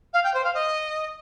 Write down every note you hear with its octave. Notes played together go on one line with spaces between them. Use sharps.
F5
G5
C5
F5
D#5